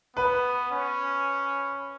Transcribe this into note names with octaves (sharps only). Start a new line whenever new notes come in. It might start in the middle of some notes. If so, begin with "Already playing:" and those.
B3 B4
C#4